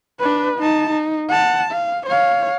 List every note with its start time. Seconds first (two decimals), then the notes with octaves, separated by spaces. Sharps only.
0.20 D4 B4
0.59 D#4 A5
0.90 D#4
1.29 F#5 A5
1.72 F5
2.07 C#5 F5